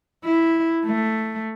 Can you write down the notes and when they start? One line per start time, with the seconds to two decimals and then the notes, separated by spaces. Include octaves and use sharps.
0.25 E4
0.85 A3